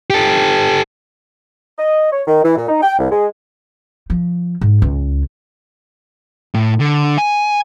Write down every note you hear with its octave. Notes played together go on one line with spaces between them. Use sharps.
G4 A4
D#5
C#5
D#3
E3
A#2
D#4
G5
C2
G#3
F3
G#2
C#2
A2
D3
G#5